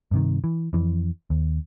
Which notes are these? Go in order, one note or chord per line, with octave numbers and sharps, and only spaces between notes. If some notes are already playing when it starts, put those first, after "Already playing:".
G2 C3 D#3
E3
F2 E3
D#2